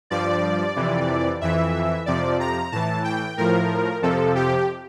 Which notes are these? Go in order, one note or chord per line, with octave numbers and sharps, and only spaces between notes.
G2 F3 D5
F2 C3 E3
F2 E3 E5
F2 C3 F3 D5
A#5
A2 E3 A5
G5
A2 F3 A#4
F2 C3 F3 A4
G4